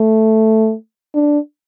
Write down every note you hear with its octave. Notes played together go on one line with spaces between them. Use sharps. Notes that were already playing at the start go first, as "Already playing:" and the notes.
Already playing: A3
D4